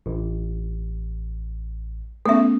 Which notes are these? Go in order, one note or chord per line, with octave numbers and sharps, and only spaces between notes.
A1
A3 B3 C#4 A4 E5